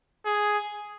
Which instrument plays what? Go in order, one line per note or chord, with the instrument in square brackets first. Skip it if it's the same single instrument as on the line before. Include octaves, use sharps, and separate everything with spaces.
[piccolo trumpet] G#4